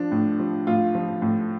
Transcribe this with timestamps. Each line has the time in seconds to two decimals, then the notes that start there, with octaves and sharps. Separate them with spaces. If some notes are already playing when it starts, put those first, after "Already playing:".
Already playing: F3 D4
0.12 A2
0.39 F3
0.67 A2 F4
0.95 F3
1.22 A2